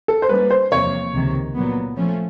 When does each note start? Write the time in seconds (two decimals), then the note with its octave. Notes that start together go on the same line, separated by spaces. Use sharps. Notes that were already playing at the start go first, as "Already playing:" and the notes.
0.08 A4
0.22 C5
0.29 G3 A#3 C#4 B4
0.51 C5
0.71 E2 C3 F3 A#3 C#5
1.13 C#2 C3 D#3
1.55 A#2 F#3 B3
1.97 F3 A3 C#4